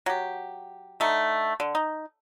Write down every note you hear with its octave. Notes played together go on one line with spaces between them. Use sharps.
F#3 G4
D3 A3 D#4
D3
D#4